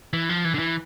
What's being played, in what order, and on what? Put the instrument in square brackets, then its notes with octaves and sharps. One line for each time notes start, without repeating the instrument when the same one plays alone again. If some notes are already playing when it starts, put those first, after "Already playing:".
[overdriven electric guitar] E3
F3
E3
D3
E3